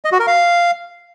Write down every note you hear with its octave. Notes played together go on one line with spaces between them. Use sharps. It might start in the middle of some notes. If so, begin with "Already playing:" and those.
D#5
F#4
A#4
F5